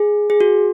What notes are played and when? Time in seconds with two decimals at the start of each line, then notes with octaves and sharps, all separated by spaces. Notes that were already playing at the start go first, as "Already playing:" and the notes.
Already playing: G#4
0.30 G#4
0.41 F#4